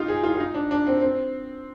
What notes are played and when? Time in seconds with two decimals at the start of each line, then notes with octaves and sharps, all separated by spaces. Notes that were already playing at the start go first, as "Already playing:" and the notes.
Already playing: D#4 F4 G4
0.08 G#4
0.23 F4
0.35 F4
0.40 D#4
0.54 D4
0.71 D4
0.87 C4
1.01 C4